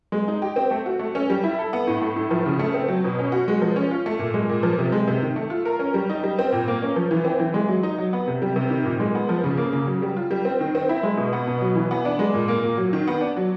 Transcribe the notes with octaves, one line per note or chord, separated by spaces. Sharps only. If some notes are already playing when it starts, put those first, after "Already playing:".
G#3
D#4
G4
C4
A3
F#4
A3
C#4
G3
E4
A4
B3
A2
A3
A2
F3
C#3
A3
C4
F#3
B2
C#4
F#4
G#3
F3
C#4
F4
A3
A#2
G#3
A#2
F3
C3
G#3
C3
D#3
A3
F4
A#4
C#4
G3
D#4
G3
C4
A#2
A#3
C#4
F3
E3
C4
E3
G#3
F#3
D#4
F#3
B3
C3
G3
C3
D#3
A#2
G#3
B3
F3
C#3
A#3
C#3
F#3
G3
F4
G3
C4
D#3
C4
E4
G#3
B2
B3
B2
F#3
E3
B3
D4
G#3
A#2
A#3
A#2
F#3
D#3
B3
D4
F#3